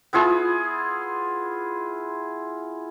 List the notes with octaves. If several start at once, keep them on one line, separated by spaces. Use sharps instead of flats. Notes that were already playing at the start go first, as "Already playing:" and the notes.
B3 E4 F4 G#4